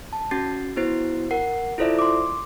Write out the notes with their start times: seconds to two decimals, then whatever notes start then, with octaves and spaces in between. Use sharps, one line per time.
0.13 A5
0.31 C#4 F#4 A6 C7
0.76 B3 E4 F#4 C5 A6 C7
1.31 A#4 F#5 C7
1.78 E4 F4 A4 C5 D5 E5
1.99 C6 D6